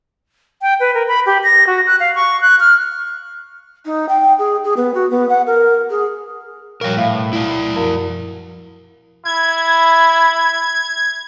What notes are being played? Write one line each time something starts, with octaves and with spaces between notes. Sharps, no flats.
G5
B4
A#4
B5
G4
A#6
F#4
F#6
F5
C#6
F#6
F6
D#4
G5
G#4
G#4
B3
F#4
B3
F#5
A#4
G#4
A#2 F3 G3 A#4 C#5
A2 E5 F5
B2
E4 D5
F#2 F3 A#4
E4 G#6